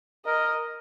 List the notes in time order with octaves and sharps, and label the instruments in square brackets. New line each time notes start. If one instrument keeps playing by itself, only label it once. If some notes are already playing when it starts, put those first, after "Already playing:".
[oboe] A#4 [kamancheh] D#5